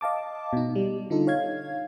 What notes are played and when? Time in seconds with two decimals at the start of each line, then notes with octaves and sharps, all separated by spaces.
0.01 D#5 F5 A5 D6
0.53 B2 D#4
0.76 G3
1.10 D3 D#4 F4 A4
1.27 C#5 F5 G#6